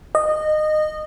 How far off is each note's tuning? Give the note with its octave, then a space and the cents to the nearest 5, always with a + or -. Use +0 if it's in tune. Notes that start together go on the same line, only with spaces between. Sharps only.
D#5 -20